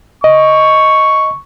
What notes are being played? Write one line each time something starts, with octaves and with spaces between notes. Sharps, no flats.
D#5 C#6